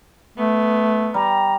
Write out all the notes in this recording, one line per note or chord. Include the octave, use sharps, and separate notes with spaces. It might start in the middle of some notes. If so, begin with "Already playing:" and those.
A3 B3
G3 A#5